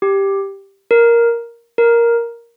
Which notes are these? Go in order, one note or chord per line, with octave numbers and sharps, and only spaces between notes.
G4
A#4
A#4